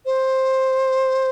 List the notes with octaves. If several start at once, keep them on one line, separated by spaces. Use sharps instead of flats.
C5